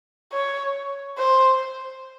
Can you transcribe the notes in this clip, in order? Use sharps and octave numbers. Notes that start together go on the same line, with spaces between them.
C#5
C5